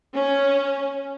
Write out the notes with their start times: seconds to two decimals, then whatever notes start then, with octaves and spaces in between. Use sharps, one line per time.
0.14 C#4